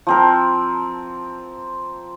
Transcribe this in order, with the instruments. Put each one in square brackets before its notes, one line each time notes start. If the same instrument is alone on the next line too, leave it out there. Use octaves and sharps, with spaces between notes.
[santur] F3 C4 A#4